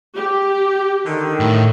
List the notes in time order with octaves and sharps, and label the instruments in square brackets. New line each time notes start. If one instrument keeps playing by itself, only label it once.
[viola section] G4
[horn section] D3 D#3
[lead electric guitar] A2